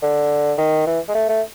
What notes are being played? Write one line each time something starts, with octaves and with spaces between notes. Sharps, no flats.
D3
D#3
E3
G#3
A3
A3